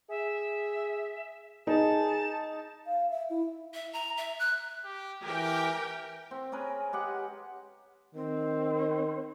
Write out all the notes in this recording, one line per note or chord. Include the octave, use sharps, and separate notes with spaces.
G#4 E5
D#4 G#4 A5
F5
E5
E4
E5
A#5
E5
F#6
G4
E3 G4 A#4 G5
C4
C#4 G#4 A#4 B4
G#3 G4 F#5
D#3 C4